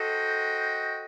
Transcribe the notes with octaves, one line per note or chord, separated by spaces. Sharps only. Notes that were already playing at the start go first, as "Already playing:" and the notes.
Already playing: F#4 A4 C5 D#5 G5